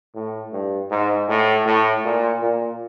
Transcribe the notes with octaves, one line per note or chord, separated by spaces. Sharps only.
A2
G2
G#2
A2
A2
A#2
A#2